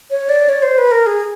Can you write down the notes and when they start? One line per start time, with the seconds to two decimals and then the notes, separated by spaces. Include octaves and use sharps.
0.11 C#5
0.29 D5
0.49 C#5
0.62 C5
0.78 B4
0.91 A#4
1.06 G#4